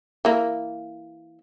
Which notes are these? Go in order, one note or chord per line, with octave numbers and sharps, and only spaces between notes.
E3 A#3